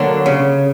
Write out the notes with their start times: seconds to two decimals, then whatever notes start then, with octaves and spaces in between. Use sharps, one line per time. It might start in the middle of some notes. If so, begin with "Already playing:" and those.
Already playing: D3 F#3 A#3 D4
0.26 C#3